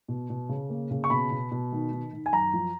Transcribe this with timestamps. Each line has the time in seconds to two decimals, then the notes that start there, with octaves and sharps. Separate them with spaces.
0.08 B2
0.30 B2
0.49 C#3
0.70 A#3
0.91 C#3
1.04 C#6
1.10 B2 B5
1.31 B2
1.51 B2
1.72 D#3
1.92 D#3
2.13 D#3
2.26 G#5
2.33 F#2 A#5
2.53 F3